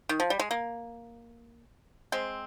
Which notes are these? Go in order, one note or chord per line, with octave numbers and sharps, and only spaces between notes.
D#3
F3
G3
G#3
A#3
G#3 C4